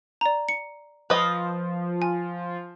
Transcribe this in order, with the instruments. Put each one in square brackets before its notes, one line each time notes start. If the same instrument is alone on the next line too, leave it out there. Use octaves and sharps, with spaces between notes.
[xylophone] D5 A#5
C#7
[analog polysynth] F3 F4 [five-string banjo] B4 D#5
[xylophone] G#5